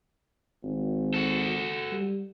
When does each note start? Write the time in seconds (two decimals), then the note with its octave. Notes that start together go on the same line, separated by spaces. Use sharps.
0.63 G#1
1.14 F#4 A4
1.92 G3